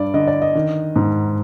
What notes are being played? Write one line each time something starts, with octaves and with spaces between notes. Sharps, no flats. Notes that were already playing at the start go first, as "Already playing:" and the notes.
Already playing: G2 D5
D3 D#5
D5
D#5
D#3
G#2